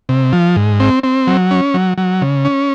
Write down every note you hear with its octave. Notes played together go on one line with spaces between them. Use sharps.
C3
F3
G#2
C4
C4
F#3
C#4
F#3
F#3
C#3
C#4